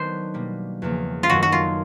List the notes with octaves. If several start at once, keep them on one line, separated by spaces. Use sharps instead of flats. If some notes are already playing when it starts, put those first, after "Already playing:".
Already playing: D#3 F#3 B3 D4 C5
B2 G3 A#3
E2 C#3 F3 A#3
F4
F#2 D#3 F#3 A3 F#4
F#4
F4